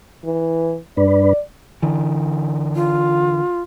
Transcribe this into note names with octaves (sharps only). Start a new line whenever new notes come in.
E3
G2 D4 B4 D5
D3 E3
F4